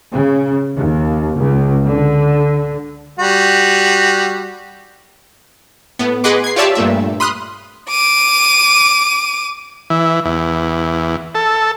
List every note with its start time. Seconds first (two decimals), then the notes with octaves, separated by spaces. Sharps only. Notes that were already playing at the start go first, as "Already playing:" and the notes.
0.12 C#3
0.76 D#2
1.38 C#2
1.84 D3
3.19 G3 F#4
5.99 A2 B3
6.24 G#4 B4 D#5 F#5 C6 D6
6.44 G#6 C7
6.56 F4 G4 C#5 D5 E5 A5
6.75 G2 A#2 A3 E5
7.20 B5 C6 D#6 F6 F#6
7.90 D6 D#7
9.90 E3
10.25 E2
11.35 A4